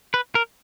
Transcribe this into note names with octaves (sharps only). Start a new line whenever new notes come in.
B4
A#4